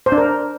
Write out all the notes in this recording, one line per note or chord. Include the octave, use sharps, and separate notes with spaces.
C5
D4
A#4